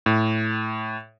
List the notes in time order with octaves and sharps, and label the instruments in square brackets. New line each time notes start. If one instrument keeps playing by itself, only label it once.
[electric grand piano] A2